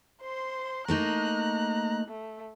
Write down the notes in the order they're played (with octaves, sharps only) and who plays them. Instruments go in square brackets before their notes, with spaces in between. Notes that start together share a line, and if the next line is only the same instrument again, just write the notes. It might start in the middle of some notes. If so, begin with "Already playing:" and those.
[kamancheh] C5 C6
[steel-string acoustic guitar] A3 A#3 D#4 [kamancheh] A#5 F#6
[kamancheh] A3